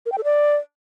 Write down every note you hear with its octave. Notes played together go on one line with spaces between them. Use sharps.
A#4
G5
A4
D5